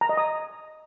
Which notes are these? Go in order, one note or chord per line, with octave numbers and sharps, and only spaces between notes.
A#5
D#5
D#6